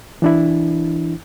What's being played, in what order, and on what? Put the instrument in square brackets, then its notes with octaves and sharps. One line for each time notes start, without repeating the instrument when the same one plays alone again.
[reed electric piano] E3 D4 E4